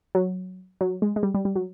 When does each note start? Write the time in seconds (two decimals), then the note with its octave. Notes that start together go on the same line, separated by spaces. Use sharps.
0.15 F#3
0.81 F#3
1.02 G#3
1.16 G#3
1.23 G3
1.34 G3
1.45 G3
1.56 F#3